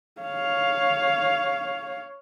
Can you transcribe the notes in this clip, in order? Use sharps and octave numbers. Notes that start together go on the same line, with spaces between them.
C#5 F5